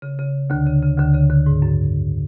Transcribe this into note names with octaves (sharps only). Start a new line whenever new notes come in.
C#3
C#3
D2 D3
C#3
C#3
D2 D3
C#3
D2 D3
G#2
F#2